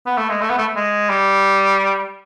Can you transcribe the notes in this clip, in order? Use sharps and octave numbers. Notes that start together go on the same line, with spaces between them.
B3
A3
G#3
A3
B3
A3
G#3
G3